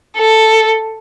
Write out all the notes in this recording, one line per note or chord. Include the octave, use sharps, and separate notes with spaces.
A4